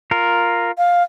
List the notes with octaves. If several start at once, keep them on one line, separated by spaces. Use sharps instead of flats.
F4 A#4
F5